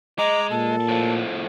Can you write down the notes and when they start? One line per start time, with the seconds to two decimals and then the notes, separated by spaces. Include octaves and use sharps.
0.18 G#3 D#5 A#5 D6
0.51 A#2 A4 A5
0.89 A2 F3